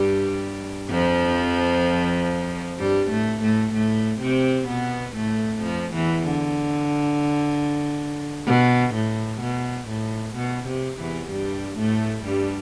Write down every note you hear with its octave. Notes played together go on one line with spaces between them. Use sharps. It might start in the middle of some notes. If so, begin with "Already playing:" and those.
Already playing: G2 G3
F2 F3
G2 G3
A2 A3
A2 A3
A2 A3
C3 C4
B2 B3
A2 A3
F2 F3
E2 E3
D3
B2
A2
B2
A2
B2
C3
E2 E3
G2 G3
A2 A3
G2 G3